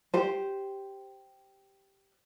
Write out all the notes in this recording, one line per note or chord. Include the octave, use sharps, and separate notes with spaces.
G4 C5